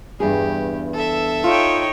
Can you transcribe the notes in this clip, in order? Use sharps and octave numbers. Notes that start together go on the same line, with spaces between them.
E2 G2 G4 G#4
A4 E5
D#4 F4 C#5 G5